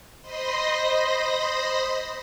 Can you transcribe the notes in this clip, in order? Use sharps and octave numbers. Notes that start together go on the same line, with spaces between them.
C5 D#5 B5 C6 D#6 A#6